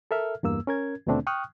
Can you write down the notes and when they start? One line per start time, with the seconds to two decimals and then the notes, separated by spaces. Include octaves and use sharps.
0.11 A4 A#4 E5 F6
0.43 E2 G2 A#3 E6
0.67 C#4 A#4 G#6
1.07 D#2 B2 D3 A3 C4 D4
1.27 G5 C#6 D#6 F6 F#6